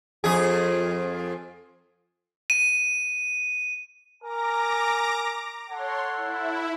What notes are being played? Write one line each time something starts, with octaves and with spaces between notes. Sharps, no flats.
F2 G#4
D#7
A#4 G#5 A#5 D6 A#6
A4 C#5 F#5 C6
E4